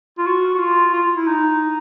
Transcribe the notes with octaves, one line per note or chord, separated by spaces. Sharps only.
F4
F#4
F#4
F4
F4
E4
D#4